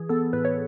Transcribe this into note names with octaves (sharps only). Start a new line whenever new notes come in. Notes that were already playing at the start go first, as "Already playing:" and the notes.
Already playing: E3 G#4
B3 A4
A2 B4
C#5